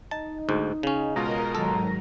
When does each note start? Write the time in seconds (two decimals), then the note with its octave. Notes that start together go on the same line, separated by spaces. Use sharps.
0.11 D#4 A5
0.49 D2 G#2
0.83 C#3 C#4
1.16 B2 G#3 F4 A#4 D#5 A#5
1.55 G#2 D#3 F#3 A4